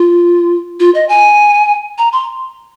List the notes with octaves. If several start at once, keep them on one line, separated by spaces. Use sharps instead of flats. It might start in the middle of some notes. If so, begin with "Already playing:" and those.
Already playing: F4
F4
D#5
G#5
A#5
C6